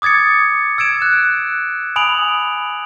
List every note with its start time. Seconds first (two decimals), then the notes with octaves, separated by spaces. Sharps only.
0.02 D6 D#6 G#6 A6 C#7
0.78 E6 G#6 D7 E7
1.02 F#6
1.96 G#5 B5 D#6 D7 F7 F#7